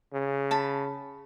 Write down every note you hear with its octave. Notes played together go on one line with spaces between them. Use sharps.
C#3
A5 B5